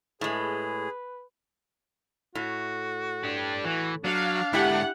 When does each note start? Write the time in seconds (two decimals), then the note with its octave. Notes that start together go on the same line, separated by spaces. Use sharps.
0.21 A2 G#3 G#4 B4
2.35 A2 F#4
3.24 D4 G4
3.65 E3 F#4
4.04 F#3 D4 F5
4.53 G#2 D3 E4 G4 E5 F#5 G5